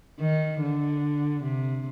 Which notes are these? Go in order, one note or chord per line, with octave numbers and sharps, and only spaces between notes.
D#3
D3
C3